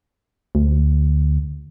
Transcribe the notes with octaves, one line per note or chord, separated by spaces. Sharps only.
D2